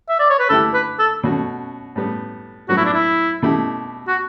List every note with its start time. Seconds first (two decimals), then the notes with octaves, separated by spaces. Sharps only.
0.09 E5
0.20 D5
0.30 C#5
0.39 B4
0.49 D3 A3 E4 G4 A4
0.74 B4
0.99 A4
1.23 B2 A3 C#4 F#4
1.96 A2 G3 B3
2.69 A2 F#3 B3 F#4
2.77 E4
2.85 D4
2.94 E4
3.42 B2 A3 E4 G4
4.08 F#4